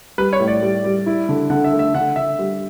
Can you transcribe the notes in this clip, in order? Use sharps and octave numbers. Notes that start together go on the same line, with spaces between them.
G3 B4
C#5
A2
D5
G3
G3
E4
D3
D3 F#5
E5
A3
E5
D3 F#5
D3 E5
G3